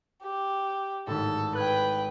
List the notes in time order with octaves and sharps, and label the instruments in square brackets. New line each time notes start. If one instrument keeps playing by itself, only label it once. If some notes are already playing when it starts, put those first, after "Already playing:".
[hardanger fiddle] G4
[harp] G#1 A2 [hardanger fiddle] A4
[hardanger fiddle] B4 G5 [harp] F#6 G#6